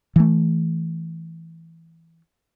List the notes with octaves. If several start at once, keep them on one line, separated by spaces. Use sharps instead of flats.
E3 A3